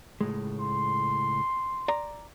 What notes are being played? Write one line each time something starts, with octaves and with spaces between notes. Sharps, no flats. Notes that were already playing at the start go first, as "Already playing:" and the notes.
C#2 A2 G#3
C6
D5 A#5